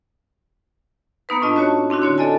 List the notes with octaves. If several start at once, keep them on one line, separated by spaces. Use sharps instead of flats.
A#3 B3 D#4 B4
A2 D4 F4 D#5 A5
C#4 F#4 C#5 A5
C4 D4 E4 F#4
D3 F#4 C#5 C6
A4 D5 D#5 G#5 A5